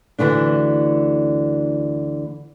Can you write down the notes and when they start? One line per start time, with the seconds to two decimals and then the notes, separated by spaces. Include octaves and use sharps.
0.19 D2 D3 E3 A3 D4